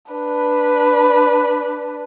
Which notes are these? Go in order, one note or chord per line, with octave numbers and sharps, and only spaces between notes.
D4 B4